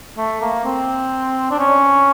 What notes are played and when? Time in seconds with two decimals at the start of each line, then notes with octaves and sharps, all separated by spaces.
0.18 A3
0.41 A#3
0.65 C4
1.51 D4
1.59 C#4